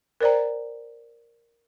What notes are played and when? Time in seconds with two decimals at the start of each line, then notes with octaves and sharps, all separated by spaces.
0.21 A#4 C5 D5 G5 A#5